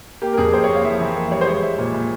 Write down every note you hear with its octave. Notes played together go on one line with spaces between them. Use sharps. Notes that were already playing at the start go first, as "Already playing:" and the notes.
A#3 G4
A#4
F2 G#4
A#3 C5
C#5
A#3
F5
E3 E5
E3 E5
A#3 E5
G3 C#5
C5
G#3 C#5
G#3 E5
A#2
A#2